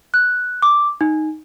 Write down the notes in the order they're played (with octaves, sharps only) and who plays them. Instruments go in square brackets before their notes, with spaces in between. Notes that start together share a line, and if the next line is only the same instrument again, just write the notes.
[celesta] F#6
D6
D#4